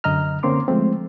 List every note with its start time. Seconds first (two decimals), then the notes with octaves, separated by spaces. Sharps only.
0.04 F#2 D3 D#5 A#5 F6
0.43 D3 A#3 C4 C#4 C6 D6
0.68 F3 G#3 A3 C4